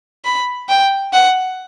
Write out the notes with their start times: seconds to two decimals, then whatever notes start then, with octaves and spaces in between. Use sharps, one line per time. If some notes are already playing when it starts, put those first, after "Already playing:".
0.25 B5
0.69 G5
1.13 F#5